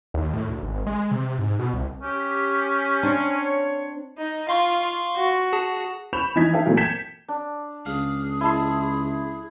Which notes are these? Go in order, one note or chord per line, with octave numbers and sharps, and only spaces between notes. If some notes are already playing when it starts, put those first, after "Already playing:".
D#2
A2
D2
G#1
G#3
C3
G#2
B2
C2
C#4 G4
C4 D4 C#5
D#4
F4 F5 C6 C#6
F#4
G#4 A5
B5 C#6 G6 E7 F7
E3 F3 D#4 G#6 B6
D#4 A4 E5 F5 G5
A#2 E3 F#3 A3 A#3 C4
G6 G#6 B6 C#7 E7
D4
C#2 G#4 F5
E4 D#5 A5 C6